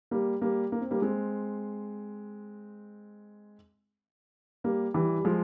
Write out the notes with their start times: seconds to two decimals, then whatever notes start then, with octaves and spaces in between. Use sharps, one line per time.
0.11 G3 A#3
0.42 G3 A#3
0.72 A#3
0.81 C4
0.91 G3 A#3
1.02 G#3 C4
4.64 G3 A#3
4.94 E3 G3
5.18 G3
5.25 F3 G#3